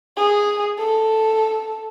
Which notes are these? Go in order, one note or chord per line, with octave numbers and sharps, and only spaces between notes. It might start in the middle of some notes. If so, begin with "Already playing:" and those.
G#4
A4